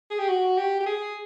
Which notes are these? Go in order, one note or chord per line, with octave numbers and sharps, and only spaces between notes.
G#4
G4
F#4
G4
G4
G#4